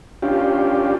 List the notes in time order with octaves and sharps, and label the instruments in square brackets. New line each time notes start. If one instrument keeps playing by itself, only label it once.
[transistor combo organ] C#4 D4 F4 G4